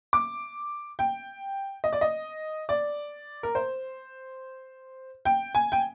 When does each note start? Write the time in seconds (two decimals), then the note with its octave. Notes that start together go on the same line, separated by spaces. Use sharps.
0.13 D6
0.99 G5
1.84 D#5
1.93 D5
2.01 D#5
2.69 D5
3.43 A#4
3.55 C5
5.25 G5
5.55 G#5
5.72 G5